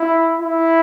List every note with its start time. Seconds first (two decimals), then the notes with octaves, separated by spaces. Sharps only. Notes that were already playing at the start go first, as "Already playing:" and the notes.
Already playing: E4
0.40 E4